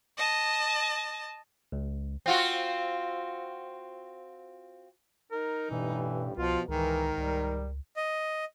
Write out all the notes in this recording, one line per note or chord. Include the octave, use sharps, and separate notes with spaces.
D#5 A5
C#2
C4 F4 F#4
D#4 A#4
A1 G2 B2 E3 G3
C2 B2 F3 F4
C#2 G#2 D#3 E3 A#4
C#2 G3
D#5